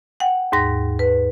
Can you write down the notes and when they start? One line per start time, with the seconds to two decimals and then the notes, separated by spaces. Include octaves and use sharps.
0.20 F#5 G5
0.52 D#2 G#2 A#6
0.99 B4